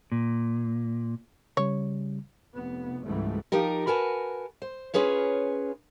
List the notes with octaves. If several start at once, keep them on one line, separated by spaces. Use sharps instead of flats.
A#2
C#3 G3 C#5
F1 B3
C#2 G#2 E3 G3 A3
F3 D#4 G4 A#4
F#4 A#4 B4 G#5 A5
C5
C#4 F4 G#4 B4 C#5